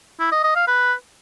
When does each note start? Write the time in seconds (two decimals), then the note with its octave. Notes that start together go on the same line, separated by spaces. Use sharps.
0.20 E4
0.32 D#5
0.44 D#5
0.56 F5
0.68 B4